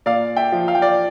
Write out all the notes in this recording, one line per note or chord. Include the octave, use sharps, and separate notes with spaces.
A#2 D5 F5
E5 G5
F3
F5
G5
D5 F5